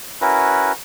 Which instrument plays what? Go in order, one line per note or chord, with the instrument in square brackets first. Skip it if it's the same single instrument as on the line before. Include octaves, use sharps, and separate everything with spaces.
[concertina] C#4 E4 F#4 A#4 B4